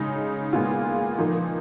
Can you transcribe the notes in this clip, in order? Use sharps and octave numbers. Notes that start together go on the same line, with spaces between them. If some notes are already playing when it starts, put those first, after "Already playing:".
Already playing: C#3 G#3 D#4
A#2 G#3 B3 F4
A#2 F3 A#3 D#4